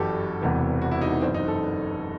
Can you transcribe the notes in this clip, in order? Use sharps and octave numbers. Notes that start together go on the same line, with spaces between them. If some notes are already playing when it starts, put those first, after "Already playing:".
Already playing: G1 F#2 E3 F#4 G4 A4
E1 E2 C3 E3
F#4
E4
D#4
B3
G1 F#2 E3 C4
D#4
A4